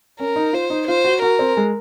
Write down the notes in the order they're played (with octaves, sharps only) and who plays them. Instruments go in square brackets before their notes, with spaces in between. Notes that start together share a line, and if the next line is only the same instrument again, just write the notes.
[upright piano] C#4 [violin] A#4
[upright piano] D#4
[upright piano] F4 [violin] C5
[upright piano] D#4
[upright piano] F4 [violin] C5
[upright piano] F#4
[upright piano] F#4 [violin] A#4
[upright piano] C4
G#3